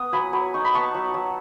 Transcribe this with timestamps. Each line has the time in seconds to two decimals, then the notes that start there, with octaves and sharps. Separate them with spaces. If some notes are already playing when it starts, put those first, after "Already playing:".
Already playing: B3 D#6
0.13 F#3 G#5 B5
0.33 F#3 G#5 B5
0.54 D#4 C#6
0.65 B5
0.74 B3 A5 C#6
0.94 F#3
1.14 F#3